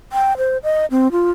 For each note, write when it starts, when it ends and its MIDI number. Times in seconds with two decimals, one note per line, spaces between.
0.12 0.37 79
0.37 0.58 72
0.63 0.86 75
0.91 1.11 60
1.12 1.31 65